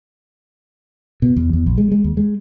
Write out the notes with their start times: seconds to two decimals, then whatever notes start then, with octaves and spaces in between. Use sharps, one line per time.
1.22 B2
1.36 E2
1.53 E2
1.66 A#1
1.78 G#3
1.92 G#3
2.04 D#2
2.17 G#3